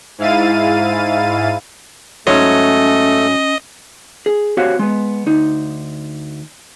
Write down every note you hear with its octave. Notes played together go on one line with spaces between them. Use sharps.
G#2 E4 F5 A6 D#7
G#2 F#3 A3 C#4 A4 C#5 D#5
G#4
C4 F#4 G4 C#5 F5
G#3 B3
D2 D#4